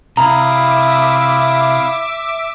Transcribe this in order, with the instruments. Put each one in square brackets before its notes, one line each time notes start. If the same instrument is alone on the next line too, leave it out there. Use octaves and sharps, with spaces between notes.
[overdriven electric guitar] C3 [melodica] E4 F5 D#6 [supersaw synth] E5 D6 [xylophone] A#5